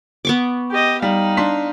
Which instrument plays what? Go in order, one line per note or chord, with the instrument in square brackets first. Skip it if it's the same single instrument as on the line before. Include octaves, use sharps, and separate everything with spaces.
[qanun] B3 C#6 D6
[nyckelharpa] G4 D#5
[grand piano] G3 [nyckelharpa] D#4 F5
[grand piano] D4 C6 B6